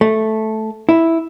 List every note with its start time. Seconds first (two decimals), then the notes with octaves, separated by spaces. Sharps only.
0.01 A3
0.89 E4